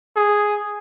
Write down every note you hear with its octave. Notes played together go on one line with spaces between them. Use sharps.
G#4